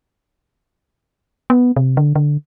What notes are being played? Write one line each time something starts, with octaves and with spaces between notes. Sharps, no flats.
B3
C3
D3
D3